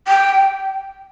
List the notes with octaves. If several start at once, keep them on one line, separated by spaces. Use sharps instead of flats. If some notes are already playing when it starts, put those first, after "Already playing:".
G5